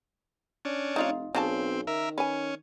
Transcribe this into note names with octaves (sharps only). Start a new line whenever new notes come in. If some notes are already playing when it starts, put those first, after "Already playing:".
C#4 D4
F1 D#4 F4 F5
B1 C#3 C4 D4 A5
D#3 A#4 E5
C#4 B4 G#5